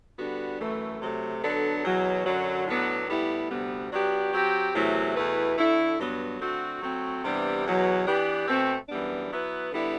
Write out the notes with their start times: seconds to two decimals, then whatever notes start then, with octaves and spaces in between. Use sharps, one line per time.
0.19 D3 G3 B3 D4 F#4
0.60 F#2 E3 A3
1.02 C3 F#3 A3
1.43 D3 F#3 B3 D4 A4
1.84 E2 B2 F#3
2.26 F#2 D3 F#3
2.67 A2 F#3 B3 D4
3.08 A2 G3 B3 E4 G4
3.51 D2 C3 G3 B3
3.92 F#3 B3 D4 G4
4.33 F#3 C4 G4
4.75 E2 C3 F#3 A3 E4
5.17 E2 B2 A3 E4 B4
5.57 D3 A3 E4
5.99 G2 F#3 B3
6.40 D3 A3 C4 F#4
6.82 F#3 A3 C4
7.24 C3 E3 G3 B3 D4
7.66 E2 B2 F#3
8.07 E3 B3 D4 G4
8.48 B2 A3 C4
8.89 F#2 E3 G3 B3 D4
9.31 F#3 B3 E4 B4
9.72 D3 G3 B3 E4 G4